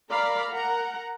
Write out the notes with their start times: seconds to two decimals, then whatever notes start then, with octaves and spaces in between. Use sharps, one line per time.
0.11 A#4 D5 F5 A#5 B5
0.51 A#4 F#5 A#5